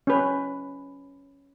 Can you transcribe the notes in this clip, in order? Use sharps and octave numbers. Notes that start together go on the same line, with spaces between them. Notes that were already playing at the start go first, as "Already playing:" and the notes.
C#4 B4